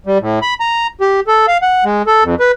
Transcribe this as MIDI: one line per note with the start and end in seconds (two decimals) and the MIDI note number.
0.06 0.18 55
0.21 0.39 45
0.42 0.54 83
0.60 0.87 82
1.01 1.20 67
1.27 1.46 69
1.48 1.58 77
1.62 1.84 78
1.85 2.02 56
2.07 2.24 69
2.24 2.35 41
2.40 2.52 71